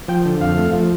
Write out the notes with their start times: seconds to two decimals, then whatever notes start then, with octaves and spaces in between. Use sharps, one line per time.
0.08 F3 G5
0.25 D3
0.41 F2 F5
0.57 A3
0.73 F3